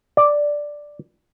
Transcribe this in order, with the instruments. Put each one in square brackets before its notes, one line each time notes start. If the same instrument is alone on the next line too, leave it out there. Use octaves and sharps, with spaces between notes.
[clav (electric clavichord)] D5